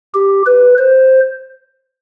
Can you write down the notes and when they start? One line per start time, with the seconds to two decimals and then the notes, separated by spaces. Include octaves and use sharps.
0.14 G4
0.46 B4
0.78 C5